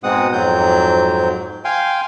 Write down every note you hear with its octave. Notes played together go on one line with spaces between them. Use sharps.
G#2 B2 G#3 C4 F#5 D#6
F2 G#2 F#3 C4 G6
F5 G5 G#5 C6